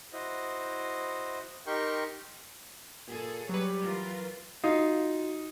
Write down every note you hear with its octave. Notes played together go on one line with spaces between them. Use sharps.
E4 F#4 C5 D#5
D#4 G4 A#4 G5 C6 C#6
A#2 G#4 A4
F#3 G3 B4 C#5
E3 F4 A#4
D#4 F4 F#4